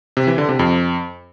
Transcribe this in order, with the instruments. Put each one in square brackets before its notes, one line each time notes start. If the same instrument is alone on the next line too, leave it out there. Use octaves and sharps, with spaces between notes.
[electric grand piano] C3
E3
D3
C3
F2